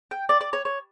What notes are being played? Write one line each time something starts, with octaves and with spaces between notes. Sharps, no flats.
G5
D5
D5
C#5
C#5